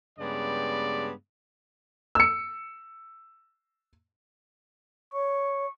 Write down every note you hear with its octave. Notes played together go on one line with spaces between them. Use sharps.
G2 C#3 G#3 B3 G4 D5
E6 C#7
C#5 C#6